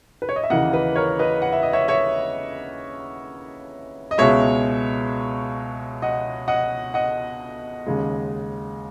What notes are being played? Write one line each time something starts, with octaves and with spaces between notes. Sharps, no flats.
B4
C#5
D#5
E5
D#2 C#3 E3 A#3 D#5 F#5
B4 D#5
A#4 C#5
B4 D#5
F#5
E5
D#5
C#5 E5
C#5 E5
D#5
C#2 B2 G#3 C#5 E5
D#5 F#5
D#5 F#5
D#5 F#5
D#2 C#3 G#3